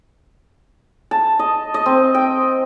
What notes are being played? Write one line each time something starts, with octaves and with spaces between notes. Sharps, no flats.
A5
D#5
D#5
C4
G5